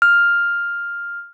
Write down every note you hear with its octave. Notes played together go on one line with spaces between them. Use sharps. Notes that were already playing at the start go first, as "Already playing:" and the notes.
F6